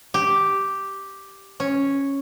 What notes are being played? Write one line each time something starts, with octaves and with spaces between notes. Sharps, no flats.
G4
C#4